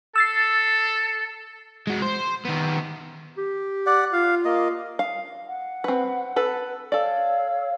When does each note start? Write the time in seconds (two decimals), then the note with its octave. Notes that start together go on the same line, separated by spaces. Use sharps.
0.16 A4 E6 A6 C7
1.87 G#3 F#4
2.02 C5
2.45 D#3 B3
3.38 G4
3.86 D5 F#5
4.13 F4 F5
4.45 A#3 D#5
4.99 F5
5.47 F#5
5.84 C4 B4
6.36 A4 B4
6.92 A4 C#5 D5 F5 E6